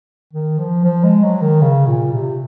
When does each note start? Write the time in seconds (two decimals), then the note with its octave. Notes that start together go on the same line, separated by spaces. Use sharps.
0.33 D#3
0.58 F3
0.84 F3
1.03 G#3
1.23 F#3
1.42 D#3
1.61 C#3
1.87 A#2
2.13 C3